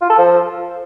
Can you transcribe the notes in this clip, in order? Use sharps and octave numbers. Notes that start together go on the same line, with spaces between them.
F4
A4
F3